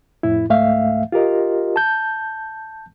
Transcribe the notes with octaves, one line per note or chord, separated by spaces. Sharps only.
F2 A2 E4
C#2 G#2 A3 E5 F5
F4 G4 A#4 D#5
A5 G6